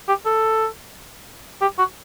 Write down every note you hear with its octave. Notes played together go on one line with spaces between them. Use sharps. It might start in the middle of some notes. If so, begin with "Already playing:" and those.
G4
A4
G4
F#4